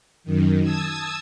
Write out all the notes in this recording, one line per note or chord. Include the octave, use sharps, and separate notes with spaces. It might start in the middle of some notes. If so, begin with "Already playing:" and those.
F#2 D#3
A5 D#6 E6 G#6